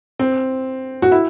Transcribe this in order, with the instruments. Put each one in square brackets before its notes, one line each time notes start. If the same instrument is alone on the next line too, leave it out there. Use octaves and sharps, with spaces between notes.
[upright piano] C4
F#4
E4